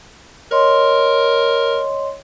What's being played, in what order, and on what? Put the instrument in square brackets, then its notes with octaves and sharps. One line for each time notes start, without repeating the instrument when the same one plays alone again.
[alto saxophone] A#4 [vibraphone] C#5 D#5 C6